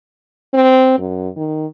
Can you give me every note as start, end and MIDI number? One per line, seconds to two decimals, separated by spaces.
0.54 0.95 60
0.99 1.28 42
1.36 1.66 51